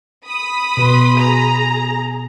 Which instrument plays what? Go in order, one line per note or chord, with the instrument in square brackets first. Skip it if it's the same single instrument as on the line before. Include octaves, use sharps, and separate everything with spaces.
[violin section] B5 D#6 B6
[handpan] B2 [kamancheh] B4 C6
[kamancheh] G#4 [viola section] A#5